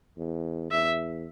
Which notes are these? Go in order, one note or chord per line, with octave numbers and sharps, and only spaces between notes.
E2
E2 E5